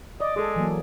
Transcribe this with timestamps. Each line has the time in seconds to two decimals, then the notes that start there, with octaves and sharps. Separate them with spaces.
0.20 D5 D#5
0.36 G#3 G#4 A4
0.56 E3 F#3 A#3